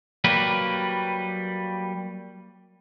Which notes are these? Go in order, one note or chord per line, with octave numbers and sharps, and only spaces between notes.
F#3 G3 A#3 G4 B4